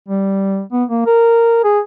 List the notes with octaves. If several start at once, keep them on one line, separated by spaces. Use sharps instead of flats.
G3
B3
A#3
A#4
G#4